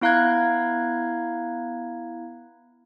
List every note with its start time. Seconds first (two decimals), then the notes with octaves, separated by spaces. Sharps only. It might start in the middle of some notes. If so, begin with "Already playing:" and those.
0.01 B3 E4 F5 A#5 F#6 G#6